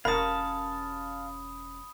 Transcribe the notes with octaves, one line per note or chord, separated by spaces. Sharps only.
E1 C#4 G4 A#4 F5 A5 B5 D#6